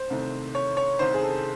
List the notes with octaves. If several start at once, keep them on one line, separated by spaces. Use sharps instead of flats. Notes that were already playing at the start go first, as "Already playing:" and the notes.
Already playing: C5
C2 C3 D#3 A3
C#5
C#5
C2 C3 D#3 C5
G#4
A4